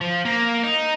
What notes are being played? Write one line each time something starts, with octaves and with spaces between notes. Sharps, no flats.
F3
A#3
D#4